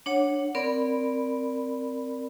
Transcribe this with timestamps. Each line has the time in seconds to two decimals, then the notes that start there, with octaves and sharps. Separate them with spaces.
0.06 D4 C#5 F#5
0.55 C4 A#4 D5 B5